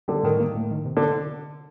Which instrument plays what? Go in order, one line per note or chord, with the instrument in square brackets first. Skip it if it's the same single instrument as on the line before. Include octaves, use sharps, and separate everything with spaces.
[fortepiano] D3 [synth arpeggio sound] G3
[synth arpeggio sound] A2 [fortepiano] D#3
[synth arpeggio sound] A#3
A2
D#3
C3
[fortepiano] D3